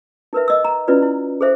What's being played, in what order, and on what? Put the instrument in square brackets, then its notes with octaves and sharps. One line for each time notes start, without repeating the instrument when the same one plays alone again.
[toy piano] D#4 A#4 B4 E5
D#5 E6
A#5
C#4 E4 F4 B4 D5
E4
G#4 A4 C5 E5